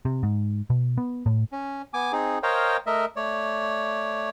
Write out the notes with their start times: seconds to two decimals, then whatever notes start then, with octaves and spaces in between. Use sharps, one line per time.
0.05 C3
0.23 G#2
0.70 B2
0.97 B3
1.26 A2
1.52 C#4
1.94 B3 G#5 D6
2.12 C4 D#4 G#4
2.43 A#4 C5 C#5 D#5 F5 G5
2.86 A3 A#4 D#5 E5
3.16 A3 C#5 D5